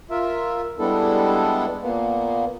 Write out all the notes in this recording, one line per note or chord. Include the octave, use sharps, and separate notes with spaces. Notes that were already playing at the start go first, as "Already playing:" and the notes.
F4 A#4 E5
G3 G#3 B3 D4 E4 A4
A#2 A#3 B3